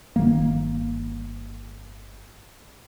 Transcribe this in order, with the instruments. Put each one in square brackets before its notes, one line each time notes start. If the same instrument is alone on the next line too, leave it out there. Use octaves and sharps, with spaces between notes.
[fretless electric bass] G1 D#3 A#3